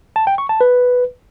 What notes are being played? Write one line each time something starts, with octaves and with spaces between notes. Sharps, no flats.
A5
G5
C#6
A5
B4